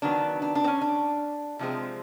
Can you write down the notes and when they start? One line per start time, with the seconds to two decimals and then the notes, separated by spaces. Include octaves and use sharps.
0.02 D#3 F#3 B3 D4
0.42 D4
0.55 D4
0.64 C4
0.68 C#4
0.81 D4
1.59 C3 F3 G#3 C4